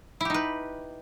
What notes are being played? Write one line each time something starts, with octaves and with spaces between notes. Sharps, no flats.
D#4 E4 G4 B4